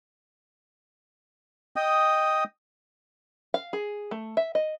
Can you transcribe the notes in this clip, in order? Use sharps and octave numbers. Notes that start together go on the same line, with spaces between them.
D#5 G5 D#6
F5
G#4
A3
E5
D#5